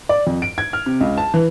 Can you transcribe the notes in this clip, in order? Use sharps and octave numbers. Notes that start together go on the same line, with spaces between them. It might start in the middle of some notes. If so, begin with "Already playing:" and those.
D5
F2
D7
G#6
F6
C3
C#2
A5
E3